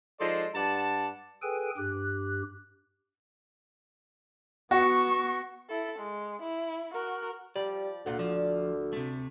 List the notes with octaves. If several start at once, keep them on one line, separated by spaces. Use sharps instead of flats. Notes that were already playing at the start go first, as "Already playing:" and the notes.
F3 G#3 D#4 A4 D5 C6
G2 D5 F#5 A5
G#4 A4 B4 G5 G#5
G2 G4 F#6
B3 F#4 C#6
E4 A4
G#3
E4
F#4 A#4
F3 G3 D5
D2 A#2 F4 F#5
F3 D5
C3 A3